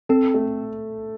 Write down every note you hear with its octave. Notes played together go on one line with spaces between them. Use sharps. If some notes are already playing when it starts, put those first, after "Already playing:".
C4 A4
A3